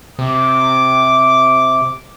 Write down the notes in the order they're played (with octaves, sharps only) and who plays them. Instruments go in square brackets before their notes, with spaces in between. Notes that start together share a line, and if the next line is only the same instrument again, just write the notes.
[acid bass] C3 [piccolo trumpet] D6